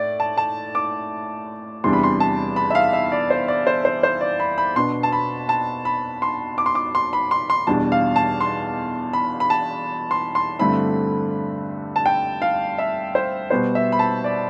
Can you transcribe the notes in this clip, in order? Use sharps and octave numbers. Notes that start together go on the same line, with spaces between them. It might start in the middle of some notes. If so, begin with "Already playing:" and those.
Already playing: A2 D5
A5
A5
D6
E2 C3 E3 G3 D4 C6
B5
C6
A5
B5
E5
F5
E5
D5
C5
D5
C5
C5
C5
D5
B5
B5
B2 B3 D4 C6
A5
B5
A5
B5
C6
D6
C6
D6
C6
B5
C6
C6
E2 B2 G3 D4 A5
F5
A5
C6
B5
B5
A5
C6
C6
G2 D3 A3 C4 E4 B5
A5
G5
F5
E5
C5
B2 G3 B3 C5
E5
B5
A5
D5